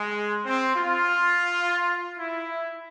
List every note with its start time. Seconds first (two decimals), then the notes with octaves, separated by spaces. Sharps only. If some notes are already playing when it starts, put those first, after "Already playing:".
Already playing: G#3
0.46 C4
0.74 F4
2.18 E4